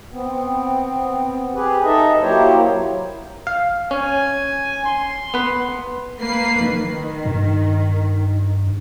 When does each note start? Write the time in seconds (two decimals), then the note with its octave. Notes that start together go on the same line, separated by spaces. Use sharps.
0.12 B3 C4
1.55 G4 G#4 B4
1.84 D#4 A4 D#5 E5
2.21 F#3 A#3 E4 G4 C5 C#5
3.47 F5
3.91 C#4 G#5
4.85 C6
5.34 B3 B4
6.20 A#3 B4 C7
6.66 D#3
7.25 G2